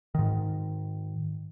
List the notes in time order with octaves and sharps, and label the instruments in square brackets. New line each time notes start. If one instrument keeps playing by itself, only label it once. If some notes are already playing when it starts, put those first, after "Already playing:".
[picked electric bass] G#2 D#3